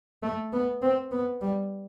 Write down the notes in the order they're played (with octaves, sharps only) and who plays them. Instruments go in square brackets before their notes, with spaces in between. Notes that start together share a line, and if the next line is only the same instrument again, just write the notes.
[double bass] A3
B3
C4
B3
G3